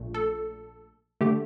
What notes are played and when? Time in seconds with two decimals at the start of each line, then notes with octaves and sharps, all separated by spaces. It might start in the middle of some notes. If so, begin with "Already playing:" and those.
Already playing: A#1 A#2 A3
0.14 A4
1.21 D3 A3 G4